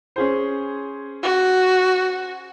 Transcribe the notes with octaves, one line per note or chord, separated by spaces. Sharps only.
C#4 G#4 C5
F#4